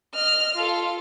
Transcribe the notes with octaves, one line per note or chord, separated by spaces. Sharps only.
D#5 F6
F4 A4